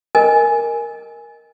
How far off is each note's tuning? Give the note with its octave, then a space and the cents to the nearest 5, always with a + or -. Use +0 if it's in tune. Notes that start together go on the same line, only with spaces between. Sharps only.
A#4 +0 D#5 +0 G#5 +0